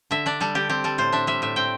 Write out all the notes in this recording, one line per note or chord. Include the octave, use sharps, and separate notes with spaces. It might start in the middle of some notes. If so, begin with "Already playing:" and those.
D3 E5
D4 D5
G3 A4
D3 G4
C4 G4
G3 A4
A2 C5
D4 E5
G3 E5
A2 E5
C4 G5